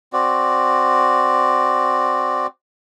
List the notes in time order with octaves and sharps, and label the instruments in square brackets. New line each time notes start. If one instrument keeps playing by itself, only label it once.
[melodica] C4 F#4 D5